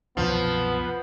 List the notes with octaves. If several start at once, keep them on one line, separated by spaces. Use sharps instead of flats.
C2 F#2 B2 F3 B3